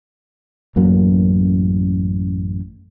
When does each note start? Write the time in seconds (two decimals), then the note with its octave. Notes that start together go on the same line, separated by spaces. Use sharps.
0.76 A1 F#2 F#3 A#3